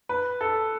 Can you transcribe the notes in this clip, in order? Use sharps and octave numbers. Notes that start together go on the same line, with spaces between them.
B4
A4